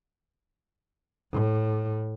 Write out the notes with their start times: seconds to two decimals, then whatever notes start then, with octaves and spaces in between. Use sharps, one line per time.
1.32 A2